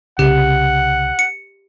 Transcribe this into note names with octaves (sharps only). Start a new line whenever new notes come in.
C2 C#3 G4 F#5
C#7